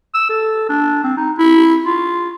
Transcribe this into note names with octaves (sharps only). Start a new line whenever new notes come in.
E6
A4
D4
C4
D#4
E4
F4